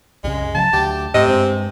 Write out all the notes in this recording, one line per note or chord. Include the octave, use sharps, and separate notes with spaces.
C2 F#2 C#3 G#3
C#3 E3 F#3 A5
D2 G4
G#2 C3 A3 D#5
G2 G#3 C4